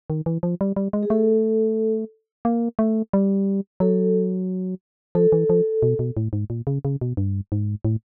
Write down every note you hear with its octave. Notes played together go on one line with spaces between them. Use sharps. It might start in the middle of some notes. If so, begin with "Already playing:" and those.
D#3
E3
F3
G3
G3
G#3
G#4
A3 A4
A#3
A3
G3
F#3 A4
F3 A4
E3
F3
B2
B2
A2
G#2
A#2
C#3
C#3
B2
G2
G#2
A2